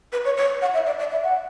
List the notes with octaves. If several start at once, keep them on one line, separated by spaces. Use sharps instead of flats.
B4
C#5
C#5
F#5
E5
D5
D5
E5
F#5